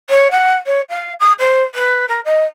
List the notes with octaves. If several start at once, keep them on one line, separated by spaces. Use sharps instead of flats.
C#5
F#5
C#5
F5
D#6
C5
B4
A#4
D#5